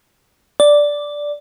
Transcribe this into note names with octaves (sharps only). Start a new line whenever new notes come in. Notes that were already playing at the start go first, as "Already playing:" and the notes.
D5